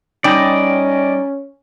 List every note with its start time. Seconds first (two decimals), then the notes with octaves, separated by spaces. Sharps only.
0.24 G3 C#4 D#4 D5 D#5 G5